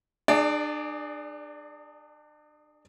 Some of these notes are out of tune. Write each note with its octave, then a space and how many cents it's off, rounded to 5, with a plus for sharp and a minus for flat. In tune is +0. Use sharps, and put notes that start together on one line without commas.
D4 +40 G#4 +0 D5 +0